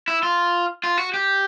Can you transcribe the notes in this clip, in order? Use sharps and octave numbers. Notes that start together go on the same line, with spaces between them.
E4
F4
F4
F#4
G4